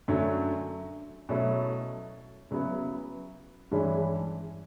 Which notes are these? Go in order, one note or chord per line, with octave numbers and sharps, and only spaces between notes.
F#2 D3 F#3 A3
B2 F#3 A3 C#4 E4
C#3 F#3 B3 E4
G2 E3 G#3 C#4 E4